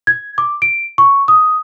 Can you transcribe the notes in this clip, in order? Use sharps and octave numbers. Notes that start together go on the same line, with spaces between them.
G#6
D6
D7
C#6
D#6